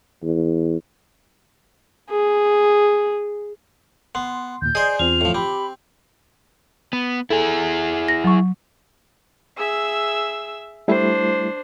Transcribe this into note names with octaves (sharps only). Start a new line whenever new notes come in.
E2
G#4
B3 C6
D#2 A#2 G6
G#4 C5 D5 D#5 G#5
E2 C4 F4 F7
A2 F3
C4 G4 B5 D6
B3
E4 G#4 A4
A#6
F#3 C#6
G#4 E5 E6
G3 A3 D4 E4 C5